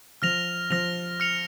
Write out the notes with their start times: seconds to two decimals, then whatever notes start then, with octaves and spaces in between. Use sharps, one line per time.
0.22 F3 F6 A#6 F7
0.70 F3 F6 A#6 F7
1.20 F6 C#7 F7